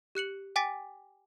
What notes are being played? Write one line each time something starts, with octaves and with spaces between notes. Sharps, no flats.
G4 F#6 C#7 F#7
G5 G#5 D6 A6 B6